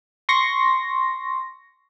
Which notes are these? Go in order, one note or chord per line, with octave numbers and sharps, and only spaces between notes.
C6 C#6 A#6